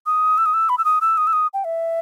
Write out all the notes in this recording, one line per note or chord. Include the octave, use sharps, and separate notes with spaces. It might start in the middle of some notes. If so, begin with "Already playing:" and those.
D#6
E6
D#6
E6
B5
E6
D#6
E6
D#6
E6
D#6
G5
E5